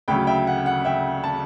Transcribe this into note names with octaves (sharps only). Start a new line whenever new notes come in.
D2 C#3 F#3 G5 B5
E5 G5
F#5
F#5
E5 G5
A5